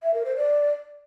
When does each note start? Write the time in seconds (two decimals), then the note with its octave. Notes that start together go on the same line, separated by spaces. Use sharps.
0.03 E5
0.14 A#4
0.25 C5
0.36 D5